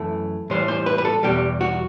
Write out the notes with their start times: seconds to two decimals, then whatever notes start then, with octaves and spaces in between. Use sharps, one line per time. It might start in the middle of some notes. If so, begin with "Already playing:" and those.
Already playing: F#2 E3 A3 A4
0.50 A2 E3 G3 C5
0.68 C5
0.86 B4
0.98 B4
1.05 A4
1.23 E2 B2 G3 G4
1.61 F#4